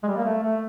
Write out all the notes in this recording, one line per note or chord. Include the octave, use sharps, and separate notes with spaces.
G#3
G3
A#3
A3
A3